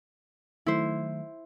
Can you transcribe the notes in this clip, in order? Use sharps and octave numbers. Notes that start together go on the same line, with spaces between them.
D#3 F#3 A3 E4 C5